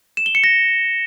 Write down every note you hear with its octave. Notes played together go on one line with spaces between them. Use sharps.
E7
G7
C#7
A#6